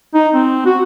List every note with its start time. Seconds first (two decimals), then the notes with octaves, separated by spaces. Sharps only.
0.14 D#4
0.33 C4
0.66 F#4